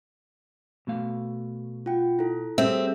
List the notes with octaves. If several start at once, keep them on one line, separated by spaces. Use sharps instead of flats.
B2 A3 F5
F4 F#5 G5
E4 A4
G3 C4 G#4 A4 E5